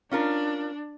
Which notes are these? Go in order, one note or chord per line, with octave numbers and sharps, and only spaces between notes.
C#4 D4 F4 A#4